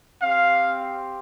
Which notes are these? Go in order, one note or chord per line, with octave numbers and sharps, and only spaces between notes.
C4 G4 F5